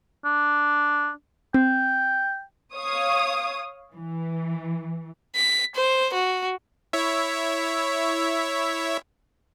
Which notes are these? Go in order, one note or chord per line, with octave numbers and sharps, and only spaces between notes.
D4
C4 G5
C#5 F5 D#6
E3
B6
C5
F#4
E4 C#5 E5